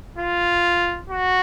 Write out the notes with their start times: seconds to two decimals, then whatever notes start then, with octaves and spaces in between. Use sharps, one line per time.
0.18 F4
1.10 F#4